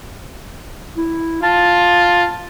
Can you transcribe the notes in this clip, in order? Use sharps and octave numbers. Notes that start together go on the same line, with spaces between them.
E4
F4 A5